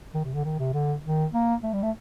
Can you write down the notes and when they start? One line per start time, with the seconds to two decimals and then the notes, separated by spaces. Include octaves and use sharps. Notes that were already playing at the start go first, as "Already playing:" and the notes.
0.14 D#3
0.25 C3
0.34 D3
0.45 D#3
0.59 C3
0.74 D3
1.04 D#3
1.34 A#3
1.63 A3
1.73 G3
1.83 A3